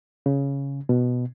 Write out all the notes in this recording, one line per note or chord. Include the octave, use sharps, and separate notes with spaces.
C#3
B2